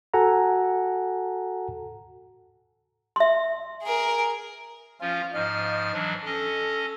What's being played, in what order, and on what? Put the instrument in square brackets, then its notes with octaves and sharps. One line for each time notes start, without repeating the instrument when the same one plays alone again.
[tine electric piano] F#4 A4 F#5 G#5 A#5
[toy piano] E5 C6
[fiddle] G#4 A#4
[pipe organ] F3 C#4 F4 [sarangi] F5
[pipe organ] G#2 F3 F6 [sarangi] D#5
[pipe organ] E3 F#3 D4
[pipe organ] C#4 D#5 [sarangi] A4